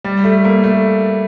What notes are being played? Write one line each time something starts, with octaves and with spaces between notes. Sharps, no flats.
G3
A3
A#3
A3